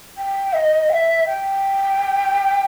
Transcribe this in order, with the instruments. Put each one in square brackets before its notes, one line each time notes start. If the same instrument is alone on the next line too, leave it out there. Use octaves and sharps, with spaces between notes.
[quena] G5
D#5
G5
E5
G5